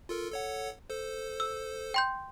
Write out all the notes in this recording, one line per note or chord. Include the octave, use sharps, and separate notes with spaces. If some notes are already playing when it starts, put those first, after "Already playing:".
F4 A4 A#4
A4 C#5 F#5
A4 C5
E6
G5 C6 G6